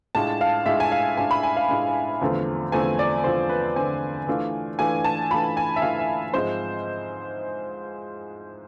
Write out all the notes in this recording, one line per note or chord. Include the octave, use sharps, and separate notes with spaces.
A2 G#3 D4 F4 A5
F5
A2 G#3 D4 F4 E5
G#5
F5
A2 G#3 D4 F4 G#5
B5
G#5
F5
A2 G#3 D4 F4
E2 D3 F3 A3 C4
E2 D3 F3 A3 C4 G#5
D5
E2 D3 F3 A3 C4 C5
B4
E2 D3 F3 A3 C4 G#5
E3 A3 D4 F4
E3 A3 D4 F4 G#5
A5
E3 A3 D4 F4 B5
G#5
E5
E3 A3 D4 F4 F5
E5
G#2 F3 G#3 C4 C5